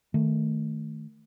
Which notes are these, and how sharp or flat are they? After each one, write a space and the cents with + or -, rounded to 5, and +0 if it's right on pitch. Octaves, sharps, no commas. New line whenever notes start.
D#3 +0 A3 +0